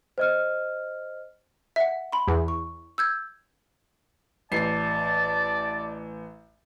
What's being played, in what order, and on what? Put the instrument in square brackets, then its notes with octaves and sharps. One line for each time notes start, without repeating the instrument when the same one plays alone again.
[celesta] C5 D#5 F6
[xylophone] E5 F#5
B5 C6
[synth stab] E2
[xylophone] C#6
E6 G6 G#6
[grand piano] A1 C7 [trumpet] D5 [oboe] A5